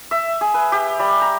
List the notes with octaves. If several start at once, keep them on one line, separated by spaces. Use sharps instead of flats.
E5
G#4
B4
G4
G3
A#5